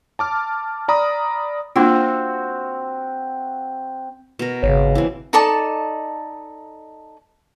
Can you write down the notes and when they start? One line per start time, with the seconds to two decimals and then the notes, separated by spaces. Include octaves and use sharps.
0.19 A5 D6 F6
0.88 D5 A#5 B5 D#6
1.76 A#3 C4 D4 F4 F#4 F5
4.39 B2 A#4
4.63 G#1 C#3 C#5
4.95 E3 C4
5.33 D#4 A4 D5 A5